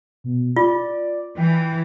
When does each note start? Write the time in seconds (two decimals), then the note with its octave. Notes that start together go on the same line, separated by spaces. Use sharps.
0.24 B2
0.56 F4 D5
1.38 E3 G5